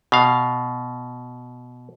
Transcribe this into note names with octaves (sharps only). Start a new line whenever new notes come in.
B2 F5